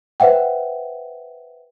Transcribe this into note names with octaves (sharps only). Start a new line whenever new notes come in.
B4 C5 E5 F#5 G5